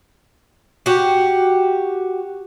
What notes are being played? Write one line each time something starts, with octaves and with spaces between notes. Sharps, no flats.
F#4 G4